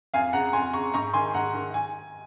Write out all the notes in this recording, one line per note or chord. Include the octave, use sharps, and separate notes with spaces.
F2 F5 G#5
C#3 F#5 A#5
F2 G#5 C6
C#3 A#5 C#6
G#2 A#5 C#6
D#3 G#5 C6
G#2 F#5 A#5
D#3
G#5